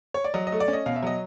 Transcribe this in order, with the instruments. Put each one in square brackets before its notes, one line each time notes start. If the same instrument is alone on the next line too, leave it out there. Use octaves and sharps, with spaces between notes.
[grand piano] C#5
D5
F#3 D#5
D#5
A3
D5
C#4
D#5
B2 F5
E5
F#3 D#5